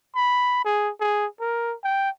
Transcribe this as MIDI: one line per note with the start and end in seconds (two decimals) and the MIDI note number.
0.15 0.60 83
0.65 0.91 68
1.00 1.26 68
1.40 1.75 70
1.84 2.09 79